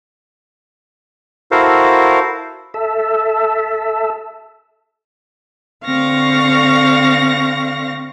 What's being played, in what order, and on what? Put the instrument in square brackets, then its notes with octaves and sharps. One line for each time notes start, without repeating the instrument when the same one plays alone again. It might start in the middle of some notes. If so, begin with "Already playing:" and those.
[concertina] E4 F#4 A4 A#4 C5 F5
[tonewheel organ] A4 E5
[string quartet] D3 C4 F5 C#6 A#6